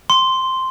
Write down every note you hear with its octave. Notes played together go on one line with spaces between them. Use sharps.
C6